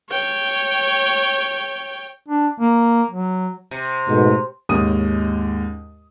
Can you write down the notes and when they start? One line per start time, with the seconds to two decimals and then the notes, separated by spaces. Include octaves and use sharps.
0.10 C#5 G5
2.28 D4
2.60 A#3
3.11 F#3
3.71 C3
4.08 G#2 B2 A3
4.69 D#2 G#2 C#4 D#6 D#7